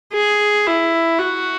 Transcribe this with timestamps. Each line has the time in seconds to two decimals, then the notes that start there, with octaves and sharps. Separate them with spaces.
0.14 G#4
0.67 E4
1.18 F#4